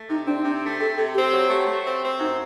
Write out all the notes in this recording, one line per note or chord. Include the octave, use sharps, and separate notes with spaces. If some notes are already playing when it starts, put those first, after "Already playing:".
Already playing: A3
C3 D#4
C4 D4
C3 D4
A3
C3 A4
C3 A4
C4 G4
F#3 G4
A3
A3
C4
C4
F#2 D#4